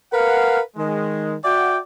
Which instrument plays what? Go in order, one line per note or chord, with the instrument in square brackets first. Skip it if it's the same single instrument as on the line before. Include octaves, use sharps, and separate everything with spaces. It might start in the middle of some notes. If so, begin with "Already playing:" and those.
[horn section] A#4 B4 F5 F#5
D#3 G#3
F#4 D5 E5 F#5 G5